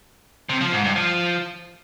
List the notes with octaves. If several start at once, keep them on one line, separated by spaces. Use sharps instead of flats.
C3
F3
G#2
G2
F3